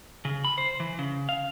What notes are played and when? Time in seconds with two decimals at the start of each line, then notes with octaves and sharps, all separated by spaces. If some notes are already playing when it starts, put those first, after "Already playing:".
0.25 C#3
0.44 B5
0.58 C5
0.80 E3
0.99 C#3
1.29 F5